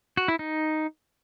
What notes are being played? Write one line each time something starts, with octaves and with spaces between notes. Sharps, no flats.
F#4
E4
D#4